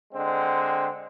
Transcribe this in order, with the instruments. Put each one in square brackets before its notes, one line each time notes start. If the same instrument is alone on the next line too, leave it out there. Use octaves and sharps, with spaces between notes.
[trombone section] D3 G#3 C4